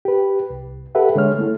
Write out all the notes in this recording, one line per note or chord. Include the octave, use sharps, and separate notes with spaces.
G4 B4
C2
G4 A4 B4 E5 F#5
D3 G#3 C#5 F6
A3 E4